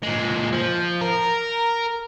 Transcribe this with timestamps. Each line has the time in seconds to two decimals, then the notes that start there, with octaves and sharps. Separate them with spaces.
0.03 A#2 G#3
0.53 F3
1.01 A#4